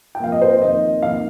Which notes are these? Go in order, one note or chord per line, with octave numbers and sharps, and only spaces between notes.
G5
F2 F3 A#3 F5
D#5
C5
F2 D#3 A#3 D#5
F2 D#3 A#3 F5